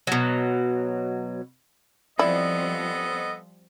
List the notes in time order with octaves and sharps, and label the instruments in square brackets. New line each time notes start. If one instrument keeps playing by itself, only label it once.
[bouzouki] B2 F#3
[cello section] F3 G3 C4 [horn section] B3 A4 D#5 [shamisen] E4 [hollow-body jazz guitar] D5